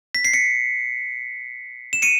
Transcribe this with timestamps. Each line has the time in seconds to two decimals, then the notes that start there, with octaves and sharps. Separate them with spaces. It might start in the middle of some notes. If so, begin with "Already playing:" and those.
0.15 B6
0.25 C7
0.33 B6 C#7
1.93 E7
2.02 C#7 D#7